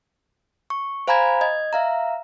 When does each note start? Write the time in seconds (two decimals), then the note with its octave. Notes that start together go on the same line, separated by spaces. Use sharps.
0.70 C#6
1.08 C5 F5 G#5 A#5 B5 G#6
1.41 D#5 G#6
1.73 E5 F5 A#5